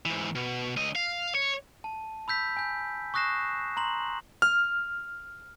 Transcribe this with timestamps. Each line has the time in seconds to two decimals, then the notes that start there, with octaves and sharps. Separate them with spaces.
0.06 G#2 E3
0.35 B2
0.76 C#2 D#5
0.95 F5
1.35 C#5
1.84 A5
2.28 B5 E6 G6 B6
2.57 G#5 G6
3.14 C#6 D#6 F#6 A#6 C7 E7
3.77 A#5 C6 F#7
4.42 F6